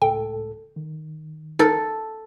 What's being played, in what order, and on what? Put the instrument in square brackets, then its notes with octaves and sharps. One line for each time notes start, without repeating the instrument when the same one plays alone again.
[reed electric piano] C#2 A2 A4 [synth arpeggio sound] G5
[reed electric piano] D#3
[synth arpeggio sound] D#4 A#4 [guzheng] A4